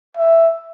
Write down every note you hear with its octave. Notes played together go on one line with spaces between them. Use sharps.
E5